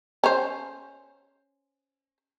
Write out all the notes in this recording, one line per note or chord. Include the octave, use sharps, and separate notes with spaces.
C#4 C5